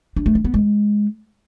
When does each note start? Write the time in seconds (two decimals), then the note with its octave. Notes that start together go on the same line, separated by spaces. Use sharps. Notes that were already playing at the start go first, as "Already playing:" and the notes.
0.16 D4
0.26 A3
0.35 C#4
0.44 B3
0.54 G#3